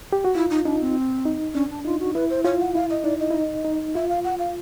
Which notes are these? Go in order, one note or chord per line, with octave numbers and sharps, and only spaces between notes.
G4
F#4
E4 F4
D#4
D4 D#4
C4
D#4
C#4 D4
D4
D#4 F4
F#4
E4 B4
C5
F4 C#5
F#5
E4 F5
D#5
D#4 D5
D#5
E4
D#4
D#4
F4 E5
F5
F#5
F5